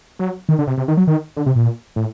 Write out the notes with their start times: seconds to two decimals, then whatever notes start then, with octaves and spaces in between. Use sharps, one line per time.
0.19 F#3
0.49 D#3
0.59 D3
0.67 C3
0.77 C3
0.88 D#3
0.97 F#3
1.07 D#3
1.37 D3
1.46 C3
1.56 A#2
1.96 A2